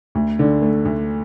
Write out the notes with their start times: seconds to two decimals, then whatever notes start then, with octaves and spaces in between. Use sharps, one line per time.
0.15 D2
0.39 D3
0.62 A3
0.85 D2